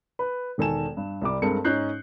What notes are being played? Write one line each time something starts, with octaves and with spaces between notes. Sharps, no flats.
B4
E1 D#3 A4 G#5 E7
G2
C2 G3 D6
G2 G#3 C4 A4 A#4 C#7
G#2 C#4 D#4 F#6 G6 C7